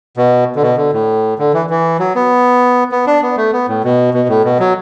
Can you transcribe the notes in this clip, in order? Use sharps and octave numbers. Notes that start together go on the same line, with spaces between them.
B2
D3
B2
D3
A2
D3
E3
E3
F#3
B3
B3
D4
B3
A3
B3
A2
B2
B2
A2
B2
F#3